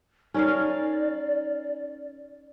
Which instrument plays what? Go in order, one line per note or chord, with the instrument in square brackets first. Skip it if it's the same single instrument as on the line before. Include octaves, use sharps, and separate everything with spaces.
[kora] C#4 A#4 F5 [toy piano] D#4 [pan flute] D5